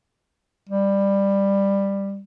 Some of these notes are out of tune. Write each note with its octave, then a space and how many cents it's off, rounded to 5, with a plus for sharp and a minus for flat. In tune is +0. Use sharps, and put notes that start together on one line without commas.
G3 +15